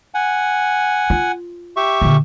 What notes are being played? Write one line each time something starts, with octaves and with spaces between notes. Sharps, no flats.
F#5 G#5
F4
G4 E5 C#6
A#2 D3